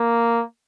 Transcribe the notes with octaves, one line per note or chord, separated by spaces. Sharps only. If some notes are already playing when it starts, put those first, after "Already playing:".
Already playing: A#3